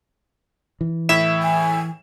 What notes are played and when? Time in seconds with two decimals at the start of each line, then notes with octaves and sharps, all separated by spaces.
0.81 E3
1.09 A2 E4 E5 E7
1.43 G#5